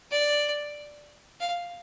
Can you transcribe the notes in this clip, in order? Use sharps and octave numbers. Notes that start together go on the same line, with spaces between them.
D5
F5